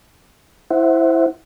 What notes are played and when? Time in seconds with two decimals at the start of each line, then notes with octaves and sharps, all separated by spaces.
0.70 E4 C5 E5 F#5